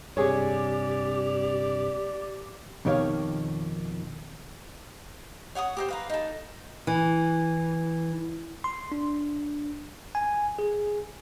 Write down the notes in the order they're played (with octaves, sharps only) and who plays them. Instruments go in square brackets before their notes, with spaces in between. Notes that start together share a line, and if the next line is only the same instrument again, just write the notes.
[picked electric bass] G2 C3 [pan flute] G4 [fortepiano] G#4 C#5 [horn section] D5
[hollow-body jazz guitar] F2 B2 D#3 G4 C#5 F5
[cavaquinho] C#5 F#5 C#6 D#6
G4 A#4 C5
B4 F5 A#5
D#4 A4
[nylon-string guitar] E3
[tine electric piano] C6
D4
G#5
G#4